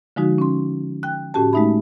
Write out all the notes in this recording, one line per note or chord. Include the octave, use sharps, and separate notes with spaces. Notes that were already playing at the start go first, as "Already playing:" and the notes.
D3 F3 G#3 D#4 F#4
C#4 C6
G5 F#6
A2 C#4 F#4 G4 A5
G#3 A3 D#4 E5 B5